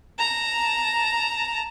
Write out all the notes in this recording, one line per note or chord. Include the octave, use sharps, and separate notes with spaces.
A5 A#5